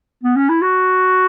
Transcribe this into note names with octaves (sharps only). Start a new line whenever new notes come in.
B3
C#4
E4
F#4